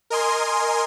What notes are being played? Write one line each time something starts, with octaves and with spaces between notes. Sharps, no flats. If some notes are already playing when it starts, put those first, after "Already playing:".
A#4 D#5 G#5 C6